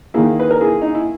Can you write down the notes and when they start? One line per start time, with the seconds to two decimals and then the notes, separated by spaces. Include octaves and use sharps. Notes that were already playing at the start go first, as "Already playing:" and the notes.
0.14 D#3 A#3 E4 G#4
0.40 B4
0.51 A#4
0.61 E4 G#4
0.81 D#4
0.95 E4